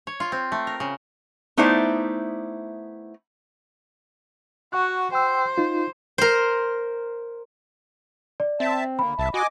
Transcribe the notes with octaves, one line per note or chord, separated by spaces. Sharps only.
C#5
F4
C4
A3
A#4
C#3
A3 B3 D#4 E4 C5 D5
F#4 F#5 C#6 F#6
C5 G5 E6
D#4 F4
A#4 C5
D5
C4 E5 A5
D2 A#3 B5
C2 E5 A5
F#4 D#5 G#5 D6